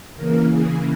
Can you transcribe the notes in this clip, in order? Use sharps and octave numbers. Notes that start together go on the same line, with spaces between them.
C#3 E3 A#3 A#4
G#4